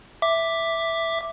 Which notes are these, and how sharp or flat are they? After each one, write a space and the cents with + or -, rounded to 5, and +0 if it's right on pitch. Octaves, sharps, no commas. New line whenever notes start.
E5 +0 D6 +0